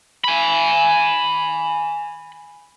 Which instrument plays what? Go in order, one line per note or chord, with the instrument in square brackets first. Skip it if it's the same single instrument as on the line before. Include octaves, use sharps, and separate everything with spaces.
[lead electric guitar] G#5 B5